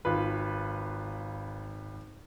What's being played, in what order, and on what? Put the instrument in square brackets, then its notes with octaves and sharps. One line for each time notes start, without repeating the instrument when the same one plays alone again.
[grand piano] G#1 F4 B4